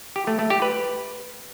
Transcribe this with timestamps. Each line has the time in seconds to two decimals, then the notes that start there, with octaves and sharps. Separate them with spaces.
0.16 G4
0.27 A3
0.39 A3
0.50 G4
0.62 B4